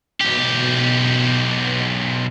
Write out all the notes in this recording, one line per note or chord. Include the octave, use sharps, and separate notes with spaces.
B1 B2 G4